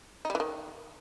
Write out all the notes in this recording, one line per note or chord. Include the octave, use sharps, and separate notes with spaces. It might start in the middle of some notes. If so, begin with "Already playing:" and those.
D#4
G3
E3
D#3